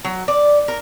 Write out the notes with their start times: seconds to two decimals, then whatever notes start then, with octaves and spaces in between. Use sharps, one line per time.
0.04 F#3
0.28 D5
0.68 A#4